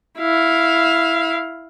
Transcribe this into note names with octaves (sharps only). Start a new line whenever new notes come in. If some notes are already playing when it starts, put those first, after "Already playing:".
E4 F5